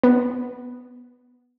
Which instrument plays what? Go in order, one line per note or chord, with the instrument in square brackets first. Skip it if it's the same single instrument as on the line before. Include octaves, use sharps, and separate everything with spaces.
[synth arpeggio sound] B3